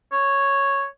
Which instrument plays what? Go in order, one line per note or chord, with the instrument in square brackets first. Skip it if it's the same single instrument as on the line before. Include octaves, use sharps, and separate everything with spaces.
[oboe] C#5